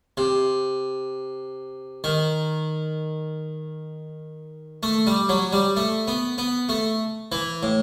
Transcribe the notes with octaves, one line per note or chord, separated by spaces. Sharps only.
C3
D#3
A3
G3
F#3
G3
A3
B3
B3
A3
E3
A2